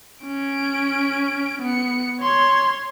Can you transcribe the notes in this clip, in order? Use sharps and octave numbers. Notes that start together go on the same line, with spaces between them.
C#4 D7
B3 C#7
C#5 C6